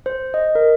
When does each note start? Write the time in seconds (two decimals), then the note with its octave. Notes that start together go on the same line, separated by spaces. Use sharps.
0.06 C5
0.34 D#5
0.55 A#4